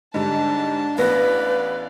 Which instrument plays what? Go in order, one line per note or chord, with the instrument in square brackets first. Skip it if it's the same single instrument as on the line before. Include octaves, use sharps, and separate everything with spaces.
[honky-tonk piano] G#2 D3 G3 [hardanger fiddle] D4 A5
[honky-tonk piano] A1 B3 A#6 [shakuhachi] B4 [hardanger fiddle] D5 F5